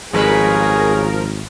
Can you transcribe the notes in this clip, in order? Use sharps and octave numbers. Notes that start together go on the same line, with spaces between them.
G#1 C#3 F3 G3 G#4 A#4 B4